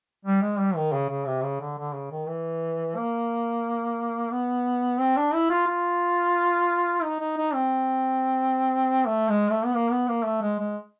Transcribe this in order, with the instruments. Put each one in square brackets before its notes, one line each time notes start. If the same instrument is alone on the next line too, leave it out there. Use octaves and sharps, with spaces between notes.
[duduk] G3
G#3
G3
D#3
C#3
C#3
C3
C#3
D3
D3
C#3
D#3
E3
A#3
B3
C4
D4
E4
F4
F4
D#4
D#4
D#4
C4
A3
G#3
A3
B3
A#3
B3
A#3
A3
G#3
G#3